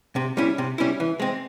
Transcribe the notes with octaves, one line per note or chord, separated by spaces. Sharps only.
C3
G3 C#4 E4
C3
G3 C#4 E4
E3
G#3 C4